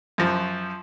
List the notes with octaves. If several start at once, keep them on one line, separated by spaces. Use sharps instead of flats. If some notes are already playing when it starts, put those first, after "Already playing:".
F#2 F3